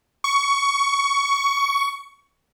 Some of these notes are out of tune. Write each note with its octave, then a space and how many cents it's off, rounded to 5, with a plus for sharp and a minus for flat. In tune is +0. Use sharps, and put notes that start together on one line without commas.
C#6 +15